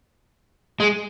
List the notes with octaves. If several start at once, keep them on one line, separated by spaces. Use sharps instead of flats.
G#3